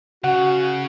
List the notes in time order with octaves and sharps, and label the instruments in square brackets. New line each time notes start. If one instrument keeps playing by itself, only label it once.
[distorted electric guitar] C#3 [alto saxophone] F#4 [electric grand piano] F#5